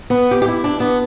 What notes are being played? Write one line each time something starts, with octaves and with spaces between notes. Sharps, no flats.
B3
G4
G4
E4
D4
B3